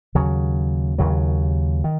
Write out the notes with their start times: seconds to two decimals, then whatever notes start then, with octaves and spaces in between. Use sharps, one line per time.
0.15 D#2 C#3 F#3
0.98 D#2 C#3 F#3
1.84 D#3